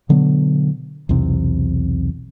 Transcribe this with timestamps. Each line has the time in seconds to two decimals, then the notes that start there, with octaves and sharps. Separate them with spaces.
0.09 B2 D3 F#3 B3
1.09 B1 E2 C3 C4